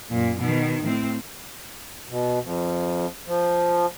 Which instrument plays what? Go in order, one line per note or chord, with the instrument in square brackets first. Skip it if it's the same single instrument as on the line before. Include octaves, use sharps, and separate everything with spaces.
[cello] F#2 A#2
B2 D#3
A2 C4
[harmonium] B2
F2
F3